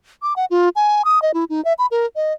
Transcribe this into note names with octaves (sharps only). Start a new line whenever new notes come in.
D6
F#5
F4
G#5
D#6
D#5
E4
D#4
E5
B5
A#4
D#5